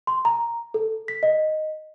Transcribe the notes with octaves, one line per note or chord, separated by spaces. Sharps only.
C6
A#5
A4
B6
D#5